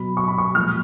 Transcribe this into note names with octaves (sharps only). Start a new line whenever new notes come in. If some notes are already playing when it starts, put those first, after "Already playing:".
Already playing: B2 F#3 B5
C#6
B5
C#6
A#2 F3 G#3 F6